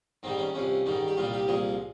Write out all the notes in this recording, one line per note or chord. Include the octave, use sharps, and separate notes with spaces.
G#2 D#3 G3 C4
C#4
C2 C3 F3 C#4
G#2 D#3 G3
G4
C2 A#2 G3 F4
G4
C2 A#2 F3 G#4